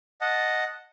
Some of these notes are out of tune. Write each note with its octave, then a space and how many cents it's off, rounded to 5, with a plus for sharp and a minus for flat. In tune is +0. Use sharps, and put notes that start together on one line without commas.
D#5 +0 F#5 -10 A5 +0